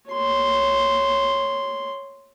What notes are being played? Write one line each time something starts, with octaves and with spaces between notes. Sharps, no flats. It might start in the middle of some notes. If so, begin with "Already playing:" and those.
C#5 C6